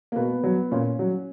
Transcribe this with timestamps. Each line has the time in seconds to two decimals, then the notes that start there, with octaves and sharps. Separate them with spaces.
0.12 A#3
0.16 B2 B3
0.43 F#3
0.72 A#2 C#4
0.99 F#3